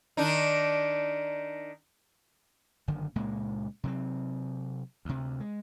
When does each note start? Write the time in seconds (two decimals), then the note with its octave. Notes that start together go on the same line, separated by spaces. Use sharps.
0.17 D#3 D4 D#4
2.88 F#1 D3 D#3
3.16 C#2 A#2 G#3 A#3
3.84 C3 F#3 C4
5.05 D2 C3
5.40 G#3